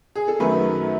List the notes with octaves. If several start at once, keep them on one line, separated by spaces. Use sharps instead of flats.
G#4
A4
F#2 D#3 F#3 A3 B4